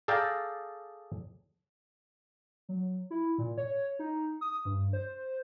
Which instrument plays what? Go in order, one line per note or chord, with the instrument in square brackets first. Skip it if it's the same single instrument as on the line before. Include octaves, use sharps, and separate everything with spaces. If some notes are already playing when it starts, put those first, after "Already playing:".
[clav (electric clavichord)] G#4 A4 D5 F5 G5 A#5
[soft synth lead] F#3
E4
A#2
C#5
D#4
D#6
G2
C5